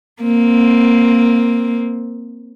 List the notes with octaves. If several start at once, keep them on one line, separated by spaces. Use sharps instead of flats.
A#3 C4